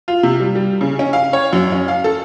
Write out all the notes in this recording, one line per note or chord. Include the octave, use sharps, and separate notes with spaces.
F4
C3
G3
G3
C#3
C#4
F5
C#5
F#2
C#4
F5
A4